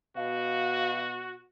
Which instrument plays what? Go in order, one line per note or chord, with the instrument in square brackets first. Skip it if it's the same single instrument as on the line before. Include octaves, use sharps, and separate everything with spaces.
[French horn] B2 [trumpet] F#4 [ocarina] F5